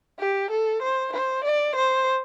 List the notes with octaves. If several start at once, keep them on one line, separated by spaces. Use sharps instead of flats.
G4
A4
C5
C5
D5
C5